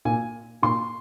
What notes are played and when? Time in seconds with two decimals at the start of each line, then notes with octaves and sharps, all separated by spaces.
0.05 A#2 G#5
0.62 A#2 C6